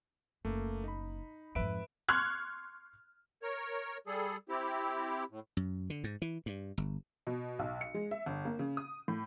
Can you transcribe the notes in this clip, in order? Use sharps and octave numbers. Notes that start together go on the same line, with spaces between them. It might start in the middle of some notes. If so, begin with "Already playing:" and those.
F#1 A3 A#3
D#4 B5
F2 G#2 B4 E5 D7
C6 C#6 F6 F#6 G#6
A#4 C#5
G3 G#4 A4
C4 E4 G4
A2
F#2
D3
G#2
E3
G2
G1
B2
B1
C#7
G#3
E5
G1
A#3
C#3
D#6
A2